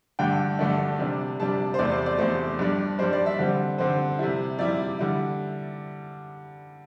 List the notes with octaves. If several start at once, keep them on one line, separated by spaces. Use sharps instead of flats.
G2 D3 A3 D4 G5
G2 D3 A3 D4
C3 G3 D4
C3 G3 D4 A5
C5
E2 C3 A3 D5
C5
D5
E2 C3 A3 C5
G2 G3 D4
G2 G3 D4 C5
D5
E5
D3 G3 C4
D3 G3 C4 C5
C3 G3 E4
C3 G3 E4 D5
D3 G3 E4